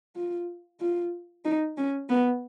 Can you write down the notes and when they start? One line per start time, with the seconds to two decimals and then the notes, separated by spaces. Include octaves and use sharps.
0.16 F4
0.80 F4
1.45 D#4
1.77 C#4
2.10 B3